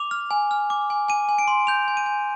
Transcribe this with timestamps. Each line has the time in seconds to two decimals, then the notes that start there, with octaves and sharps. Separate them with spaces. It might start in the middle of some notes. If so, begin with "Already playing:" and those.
Already playing: D6 F7
0.11 F6
0.31 G#5
0.51 F6
0.70 D6
0.90 G#5
1.08 G#5 D#7
1.29 G#5
1.38 D7
1.48 C6
1.67 G6 F7
1.88 G#5
1.97 D#7
2.06 G#5